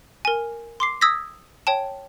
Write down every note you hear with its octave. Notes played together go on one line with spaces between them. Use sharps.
A#4 G#5
C6 D6 C7
D#6 E6 G#6 A#6 B6
C#5 G5 A5